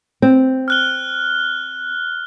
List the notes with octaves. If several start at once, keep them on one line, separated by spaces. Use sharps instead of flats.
C4
F6 F#6 G7